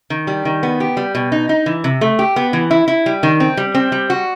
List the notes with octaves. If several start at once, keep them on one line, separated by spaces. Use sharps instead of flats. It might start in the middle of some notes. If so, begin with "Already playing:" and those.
D#3
G3
D#3
B3
G4
G3
B2
D#4
D#4
E3
C3
A3
G4
B3
E3
E4
E4
G3
D#3
C4
G3
C4
G3
F#4